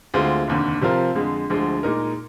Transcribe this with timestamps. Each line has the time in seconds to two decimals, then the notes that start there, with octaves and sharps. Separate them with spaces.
0.14 D2 D3 G#3 C4 F4
0.48 F1 D#2 D3
0.81 C3 F3 C4 F4 A#4
1.15 F2 D3 G#3
1.50 D2 D3 F3 G#3
1.83 A#2 G#3 D#4 A#4